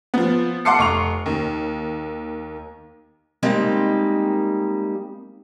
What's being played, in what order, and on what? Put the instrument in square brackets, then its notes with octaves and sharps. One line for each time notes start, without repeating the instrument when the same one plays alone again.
[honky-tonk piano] F3 B3
F#5 A5 C6 D6 C7 C#7
F1 C#6 F7
D#2
[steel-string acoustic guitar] G3 G#3 A#3 C4 D#4